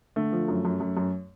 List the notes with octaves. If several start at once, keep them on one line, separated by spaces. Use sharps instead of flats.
D3 A3
F3
F#2
F#2
F#2
F#2